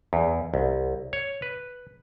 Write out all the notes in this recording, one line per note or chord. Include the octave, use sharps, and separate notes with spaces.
E2
C2
C#5
B4